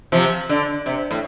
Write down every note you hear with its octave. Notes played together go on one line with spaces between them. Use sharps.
C3 F3
D3
C3
A2